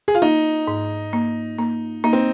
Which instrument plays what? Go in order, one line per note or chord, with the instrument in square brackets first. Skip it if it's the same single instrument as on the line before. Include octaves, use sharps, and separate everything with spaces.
[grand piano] G#4
F4
[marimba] A#3 [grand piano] D#4
[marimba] G#2
A#3
A#3
[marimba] A#3 [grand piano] D#4
[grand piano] C4